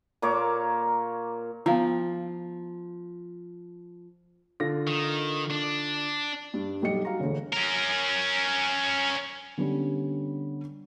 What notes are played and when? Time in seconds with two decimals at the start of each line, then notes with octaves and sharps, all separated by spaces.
0.22 A#2 A#3 C#5 D6
1.66 F3 B3 F5 A#5
4.60 D3 F4 A#6
4.87 D#3
5.51 D4
6.54 G2
6.82 B1 G3 D#5 C#7
7.05 F#4 F5 A#5
7.20 E1 D2
7.53 C#4 A#4
9.57 D3 G3 B3 C#4